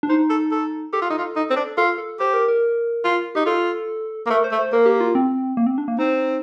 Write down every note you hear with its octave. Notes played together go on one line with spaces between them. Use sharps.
D4
D#4 C5
A4
A4
G4 A4
F4
D#4
F4
D#4
C4
D4
F4 A4
A4
G4 C5
A#4
A#4
F4
D#4 G4
F4 A4
A#3
A3 A#4
C5
A3
C5
A#3 A#4
G4
F4
C4
A#3
C4
D4
A#3
C4 D#4